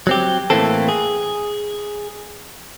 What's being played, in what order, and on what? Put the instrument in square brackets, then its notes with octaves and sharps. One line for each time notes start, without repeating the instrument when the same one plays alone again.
[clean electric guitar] F#3 C4 G4
A2 E3 A3 A#3 C4 A4
G#4